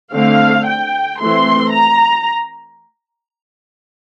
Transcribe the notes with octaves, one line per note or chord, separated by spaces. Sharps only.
D3 A3 C4 F5
G5
E3 A3 C4 C6
A#5